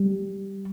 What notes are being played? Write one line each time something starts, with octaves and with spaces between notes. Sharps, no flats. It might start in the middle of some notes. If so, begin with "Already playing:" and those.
Already playing: G3